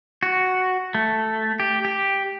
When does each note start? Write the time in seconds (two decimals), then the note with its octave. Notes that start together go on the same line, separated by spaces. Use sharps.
0.23 F#4
0.95 A3
1.60 G4
1.85 G4